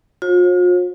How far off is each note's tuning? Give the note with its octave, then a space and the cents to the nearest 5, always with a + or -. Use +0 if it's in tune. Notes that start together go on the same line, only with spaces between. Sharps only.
F4 +45 C5 +45